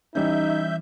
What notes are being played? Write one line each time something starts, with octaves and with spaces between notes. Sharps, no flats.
E3 G3 C#4 D#4 E5 G6